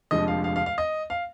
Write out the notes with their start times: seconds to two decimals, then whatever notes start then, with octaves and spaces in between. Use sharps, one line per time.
0.11 F1 F2 D3 F3 G#3 D#5
0.28 F5
0.44 F5
0.56 F5
0.66 F5
0.78 D#5
1.10 F5